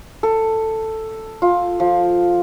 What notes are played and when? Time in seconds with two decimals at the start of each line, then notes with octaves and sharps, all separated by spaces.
0.23 A4
1.42 F4
1.80 F3